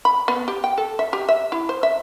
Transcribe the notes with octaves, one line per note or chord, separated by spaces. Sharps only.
B5
B3
G4
G5
A4
E5
G4
E5
E4
C5
E5